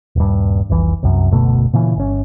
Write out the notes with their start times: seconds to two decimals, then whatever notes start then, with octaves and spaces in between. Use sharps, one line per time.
0.16 D#1 G2
0.70 F1 C2 E3
1.03 C2 F#2
1.31 F#1 D2 B2 A3
1.73 A#2 C#3 E3 C#4
1.96 G1 C#4